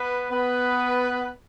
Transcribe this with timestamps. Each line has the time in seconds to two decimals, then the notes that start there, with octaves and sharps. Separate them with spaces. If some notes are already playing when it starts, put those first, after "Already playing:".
Already playing: B3 B4
0.30 B3 B4